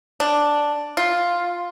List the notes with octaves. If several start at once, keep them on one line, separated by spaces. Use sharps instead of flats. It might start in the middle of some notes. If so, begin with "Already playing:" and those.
D4
F4